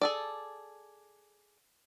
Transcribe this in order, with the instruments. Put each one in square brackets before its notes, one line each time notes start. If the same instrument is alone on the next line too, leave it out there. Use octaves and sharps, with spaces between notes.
[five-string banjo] G#4 A4 D5